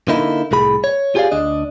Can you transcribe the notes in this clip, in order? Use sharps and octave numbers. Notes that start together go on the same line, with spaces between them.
D3 A#3 D#4 E4
C2 A2 G#4 B5
C#5
F4 G4 G#4 C5 D5 F5
D2 D4 D#5